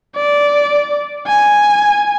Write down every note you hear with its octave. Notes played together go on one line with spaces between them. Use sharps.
D5
G#5